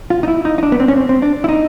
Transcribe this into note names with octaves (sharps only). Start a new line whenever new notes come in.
F4
D#4
E4
D#4
D#4
D4
B3
C4
C#4
C4
C4
D4
E4
D#4